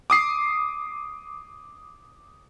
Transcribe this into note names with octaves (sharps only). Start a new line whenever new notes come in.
D6 D#6 C7